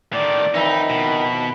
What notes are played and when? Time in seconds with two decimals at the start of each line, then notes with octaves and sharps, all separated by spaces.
0.13 A2 D#3 D5
0.54 F2 D#3 E3 D#4 E5 B5
0.90 B2